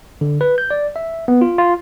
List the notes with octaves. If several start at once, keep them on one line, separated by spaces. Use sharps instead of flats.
D3
B4
G6
D5
E5
B3
F4
F4